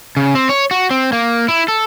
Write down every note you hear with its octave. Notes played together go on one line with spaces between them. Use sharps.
C#3
C4
C#5
F#4
C4
A#3
E4
A4